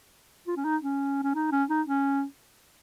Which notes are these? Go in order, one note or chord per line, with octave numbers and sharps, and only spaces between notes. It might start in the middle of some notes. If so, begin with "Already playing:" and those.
F4
C#4
D#4
C#4
C#4
D#4
C#4
D#4
C#4